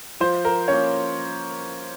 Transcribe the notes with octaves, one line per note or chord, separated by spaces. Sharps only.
F3 C5
A#4
A#3 C#4 C#5